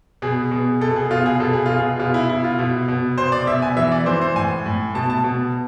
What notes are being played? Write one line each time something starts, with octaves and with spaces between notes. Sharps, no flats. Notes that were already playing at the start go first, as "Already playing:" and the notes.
B2 G#4
B2
B2 A4
G#4
B2 F4
G#4
B2 A4
G#4
B2 F4
G#4
B2 F4
E4
B2 E4
F4
B2
B2
B2 C5
D5
B2 E5
G#5
E3 E5
D5
E3 C5
C5
A2 G#5
A2
B2 A5
A5
B2